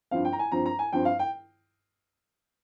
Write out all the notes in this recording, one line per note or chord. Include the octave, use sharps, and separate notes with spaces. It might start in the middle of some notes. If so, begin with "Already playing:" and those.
G2 F3 C4 F5
G5
A#5
G#5
G2 F3 C4 A#5
A#5
G#5
G2 F3 C4 G5
F5
G5